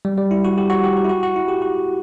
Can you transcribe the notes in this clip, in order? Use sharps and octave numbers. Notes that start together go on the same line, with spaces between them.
G3
G3
E4
F#4
G4
F#4
G4
F#4
E4
F#4
F#4
E4
G4
F#4